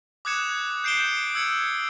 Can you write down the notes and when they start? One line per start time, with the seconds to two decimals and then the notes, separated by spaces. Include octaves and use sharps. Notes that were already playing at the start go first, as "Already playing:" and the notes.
0.25 D6 D#6 F#6 G#6 C#7 E7
0.84 G6 C7 D7 E7 G7
1.35 E6 G#6 C#7